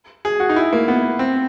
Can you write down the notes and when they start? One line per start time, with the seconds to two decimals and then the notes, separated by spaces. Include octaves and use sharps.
0.25 G#4
0.40 F#4
0.50 D#4
0.56 E4
0.73 A#3
0.88 B3
1.19 C4